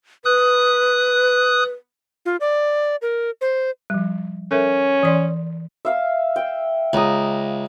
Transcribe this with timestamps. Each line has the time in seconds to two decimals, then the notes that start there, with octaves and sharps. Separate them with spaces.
0.25 B4 D#6 F#6
2.26 F4
2.41 D5
3.02 A#4
3.41 C5
3.90 F3 G3
4.51 C#4 A4 A#4 E5
5.03 E3 D5 C6
5.85 E5 F5 E6
6.36 G5
6.93 C#2 G5 A#5 D#6